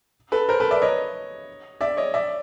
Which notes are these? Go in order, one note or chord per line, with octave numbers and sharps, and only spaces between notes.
A4 B4
A#4 C5
A4 B4
D5 E5
C#5 D#5
D5 E5
C#5 D#5
D5 E5